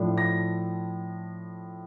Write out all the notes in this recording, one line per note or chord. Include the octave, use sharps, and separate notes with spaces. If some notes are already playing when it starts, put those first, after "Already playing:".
Already playing: A2 F3 A3 D4
A#6